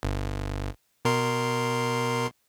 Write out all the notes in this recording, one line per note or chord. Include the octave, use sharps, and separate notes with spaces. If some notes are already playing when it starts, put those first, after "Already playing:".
G1
B2 A#4 C6